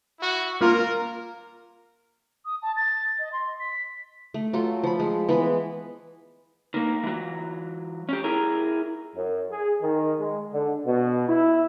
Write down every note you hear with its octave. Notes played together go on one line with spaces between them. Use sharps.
E4 F#4
A#3 F4 A#4
D#6
A5
A6
D#5
C6
B6
A3
F#3 F4 A4
F3 B5
G#3
E3 G#3 B3 B5
D#3 A#3
E3 F#3
C#4 G4
E4 G#4 A#4
F#2
G#4
D#3
G#3
D3
B2
E4